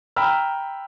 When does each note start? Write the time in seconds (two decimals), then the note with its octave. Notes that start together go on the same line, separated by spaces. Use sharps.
0.16 G5 A#5 B5 E6 F6